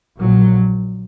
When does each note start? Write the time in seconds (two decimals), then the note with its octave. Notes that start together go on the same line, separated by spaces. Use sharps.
0.18 A#1 A#2 F#3